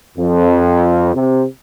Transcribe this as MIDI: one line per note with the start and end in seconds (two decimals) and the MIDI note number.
0.18 1.15 41
1.15 1.45 48